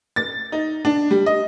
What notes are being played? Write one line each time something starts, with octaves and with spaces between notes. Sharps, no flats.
A6
D#4
D4
G3
D#5